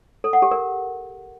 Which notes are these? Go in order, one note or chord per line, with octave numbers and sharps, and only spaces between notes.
A4
F#5
G4
A#4